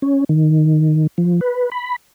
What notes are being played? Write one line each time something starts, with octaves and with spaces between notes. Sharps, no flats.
C#4
D#3
F3
B4
B5